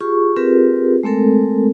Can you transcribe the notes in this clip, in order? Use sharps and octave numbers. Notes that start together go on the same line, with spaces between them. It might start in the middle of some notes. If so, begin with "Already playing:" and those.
F4 G4 G#4 C#6
C4 F4 G4 G#4 A#4 B4
G#3 A3 C4 A4 A#4